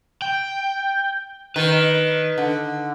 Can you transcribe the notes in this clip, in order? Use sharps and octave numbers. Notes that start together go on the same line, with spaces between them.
G5
D#3 B4
D3